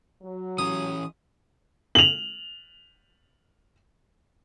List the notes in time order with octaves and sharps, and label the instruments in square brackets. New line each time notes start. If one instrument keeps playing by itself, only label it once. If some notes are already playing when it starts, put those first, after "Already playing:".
[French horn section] F#3
[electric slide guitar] E3 C#4 [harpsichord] D#6
[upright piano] F7 F#7